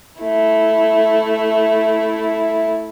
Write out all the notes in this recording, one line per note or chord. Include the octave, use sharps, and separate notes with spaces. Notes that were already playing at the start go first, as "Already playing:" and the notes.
A3 E4